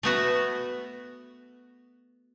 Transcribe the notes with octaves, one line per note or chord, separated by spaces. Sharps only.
A3 B3 F#4